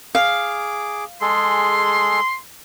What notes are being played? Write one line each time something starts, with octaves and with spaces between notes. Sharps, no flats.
G#4 F5 D6
G#3 G#4 A4 C6